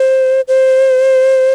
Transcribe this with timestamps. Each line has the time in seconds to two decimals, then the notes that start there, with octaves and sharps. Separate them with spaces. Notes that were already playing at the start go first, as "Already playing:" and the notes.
Already playing: C5
0.48 C5